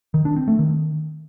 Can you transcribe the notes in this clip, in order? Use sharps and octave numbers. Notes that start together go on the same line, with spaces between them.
D#3
D4
C4
A3
D#3